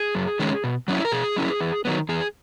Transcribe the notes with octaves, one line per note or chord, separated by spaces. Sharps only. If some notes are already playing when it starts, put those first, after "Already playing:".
Already playing: G#4
F#2
D#3 G#3 C#4
B2
F#3 C#4 E4
A#4
B2 G#4
F#3 C#4 E4
E2
D#3 F#3 B3
E2 G#4